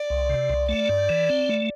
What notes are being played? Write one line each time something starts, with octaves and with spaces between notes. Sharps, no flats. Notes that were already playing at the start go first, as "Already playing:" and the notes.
Already playing: D5
C2
C3
C2
A3 D5
G2
E3
C4
A3